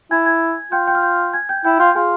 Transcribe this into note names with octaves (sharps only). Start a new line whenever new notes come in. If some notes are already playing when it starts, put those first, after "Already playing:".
E4 G#5 G#6
G#5 G#6
F4 G5 G6
G5 G6
F6
G5 G6
G#5 G#6
G5 G6
E4 G5 G6
F4 G5 G6
F4 G#4 G#5